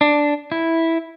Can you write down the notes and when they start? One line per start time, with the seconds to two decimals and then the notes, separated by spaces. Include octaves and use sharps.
0.01 D4
0.52 E4